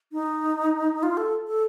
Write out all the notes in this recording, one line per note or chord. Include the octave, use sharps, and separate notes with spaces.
D#4
F4
A4
A4